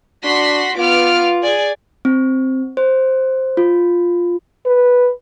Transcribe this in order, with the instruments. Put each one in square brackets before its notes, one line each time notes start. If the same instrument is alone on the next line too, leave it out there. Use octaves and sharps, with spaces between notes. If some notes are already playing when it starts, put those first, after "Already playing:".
[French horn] D4 [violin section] F#4 C6 B6
[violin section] B3 D6 F6 [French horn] F4
[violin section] G#4 D5 G#5
[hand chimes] C4
C5
F4
[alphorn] B4